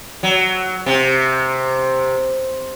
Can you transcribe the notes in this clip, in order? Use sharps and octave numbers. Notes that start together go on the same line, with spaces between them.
F#3
C3